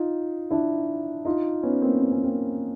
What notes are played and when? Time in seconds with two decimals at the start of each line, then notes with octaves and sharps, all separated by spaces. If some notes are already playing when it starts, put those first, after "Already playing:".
Already playing: D#4 F4
0.51 D4 E4
1.25 D#4 F4
1.63 B3 C#4
1.82 A#3 C4
2.01 C4
2.12 C#4
2.23 A#3 C4